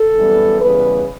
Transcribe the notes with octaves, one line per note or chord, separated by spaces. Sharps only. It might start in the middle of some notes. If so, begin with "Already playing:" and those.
Already playing: A4
F#2 E3 G3 B3
E2 C#3 G3 B3 B4